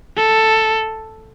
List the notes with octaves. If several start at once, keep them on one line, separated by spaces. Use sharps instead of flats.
A4